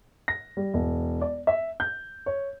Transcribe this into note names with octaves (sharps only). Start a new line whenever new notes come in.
A#6
G3
E1
D5
E5
G6
C#5